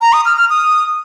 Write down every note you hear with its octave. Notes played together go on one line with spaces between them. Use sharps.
A#5
D#6
F6
F6
D#6